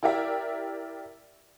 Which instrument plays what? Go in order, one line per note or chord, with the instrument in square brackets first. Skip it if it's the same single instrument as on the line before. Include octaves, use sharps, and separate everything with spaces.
[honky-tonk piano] E4 G4 A#4 D5 E5